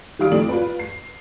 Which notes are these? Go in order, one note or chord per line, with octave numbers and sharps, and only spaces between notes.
D#3 G3 F5 D#6 D7
F2 A2 D5 D7 F#7
F4 B4
C7